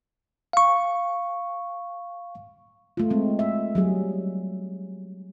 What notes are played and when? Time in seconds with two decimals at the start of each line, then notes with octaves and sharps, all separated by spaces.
0.53 F5 C#6
2.97 A3 F4
3.10 G#3 C4
3.39 E5
3.75 F#3 G3 G#4